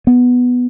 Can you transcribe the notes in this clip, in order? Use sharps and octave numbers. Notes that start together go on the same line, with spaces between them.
B3